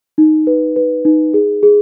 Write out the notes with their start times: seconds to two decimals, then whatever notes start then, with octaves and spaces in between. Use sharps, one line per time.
0.18 D#4
0.47 B4
0.76 B4
1.05 D#4
1.34 G#4
1.63 G#4